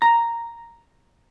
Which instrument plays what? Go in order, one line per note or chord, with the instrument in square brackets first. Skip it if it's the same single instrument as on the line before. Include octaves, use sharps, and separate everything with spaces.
[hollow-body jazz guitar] A#5